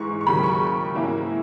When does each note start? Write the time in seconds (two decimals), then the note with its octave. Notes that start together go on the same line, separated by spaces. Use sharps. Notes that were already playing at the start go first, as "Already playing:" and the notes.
Already playing: G#2 E3 G#3 C#6
0.21 C#6
0.26 D#2 C#3 F#3 B5
0.43 C#6
0.95 G#2 E3 A#3 C#4 E4